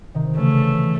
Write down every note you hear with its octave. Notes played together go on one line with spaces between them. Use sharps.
C3 D#3
C#3 E3 A3